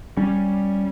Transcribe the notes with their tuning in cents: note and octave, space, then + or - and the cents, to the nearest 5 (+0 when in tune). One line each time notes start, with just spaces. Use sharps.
G3 +0 C#4 +0